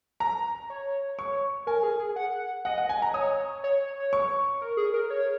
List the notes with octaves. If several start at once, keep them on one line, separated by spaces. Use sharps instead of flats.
A#5
C#5
C#6
A#4 G#5
G#4
G#4
F#5
D#5 F#5
F#5
G#5
A#5
C#5 D#6
C#5
C#6
A#4
G#4
A#4
C#5